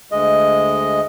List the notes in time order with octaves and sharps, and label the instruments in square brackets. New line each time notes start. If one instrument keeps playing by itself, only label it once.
[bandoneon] D2 G#3 D#5